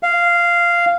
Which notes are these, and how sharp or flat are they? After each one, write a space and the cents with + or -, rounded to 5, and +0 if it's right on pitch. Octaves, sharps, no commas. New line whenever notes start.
F5 -10